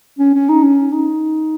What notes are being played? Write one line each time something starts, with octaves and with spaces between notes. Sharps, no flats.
C#4
C#4
D#4
C#4
D#4